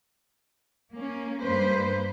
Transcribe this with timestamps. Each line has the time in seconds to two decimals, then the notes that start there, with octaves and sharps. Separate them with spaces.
0.93 A#3 C#4
1.42 G2 A#3 B4 C5